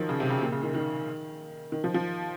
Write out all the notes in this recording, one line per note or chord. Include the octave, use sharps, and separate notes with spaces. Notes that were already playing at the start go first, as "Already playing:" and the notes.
Already playing: D#3 F3 F#3
C#3
C3
C#3
A#2
C#3
D#3
D#3
D#3
F3
F3